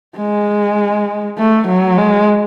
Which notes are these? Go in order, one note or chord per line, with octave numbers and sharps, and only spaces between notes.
G#3
A3
F#3
G#3